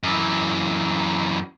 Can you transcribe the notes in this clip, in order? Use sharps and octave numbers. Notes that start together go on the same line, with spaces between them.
F#2 E3